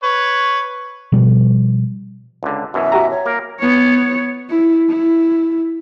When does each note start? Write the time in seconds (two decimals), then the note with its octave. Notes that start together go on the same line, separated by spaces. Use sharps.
0.03 B4 C#5
1.12 B2 F3 G3
2.43 C#2 D3
2.74 F#2 B2 E3 E5
2.92 F#4 G4 A#5
3.10 C#5
3.25 A#3 A#4
3.60 B3 C#5
4.50 E4
4.89 E4